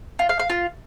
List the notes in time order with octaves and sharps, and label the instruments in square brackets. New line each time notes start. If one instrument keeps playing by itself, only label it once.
[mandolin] F4
F5
F5
F4